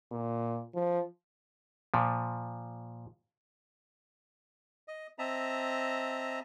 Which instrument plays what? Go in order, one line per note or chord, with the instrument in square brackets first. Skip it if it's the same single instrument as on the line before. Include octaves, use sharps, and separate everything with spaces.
[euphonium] A#2
F3
[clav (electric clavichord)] A#2 F3
[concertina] D#5
C4 D#5 E5 A5 A#5